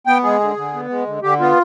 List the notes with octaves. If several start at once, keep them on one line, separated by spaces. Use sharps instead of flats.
B3 G5
G#3 G#4
D3
D3
B3
G#3
D3
D3 G4
B3 F4